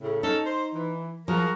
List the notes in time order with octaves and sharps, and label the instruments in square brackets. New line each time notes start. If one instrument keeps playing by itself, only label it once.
[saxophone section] A2 C#3
[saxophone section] C#4 A4 [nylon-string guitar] D#4
[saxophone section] C5
E3
[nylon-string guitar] F3 [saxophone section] F#4 G#4 A#4